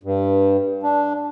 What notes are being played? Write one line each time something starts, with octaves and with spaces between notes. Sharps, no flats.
G2
D4